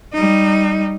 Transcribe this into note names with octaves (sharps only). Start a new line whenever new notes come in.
G3 D#4